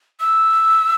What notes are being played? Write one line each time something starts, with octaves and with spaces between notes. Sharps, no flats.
E6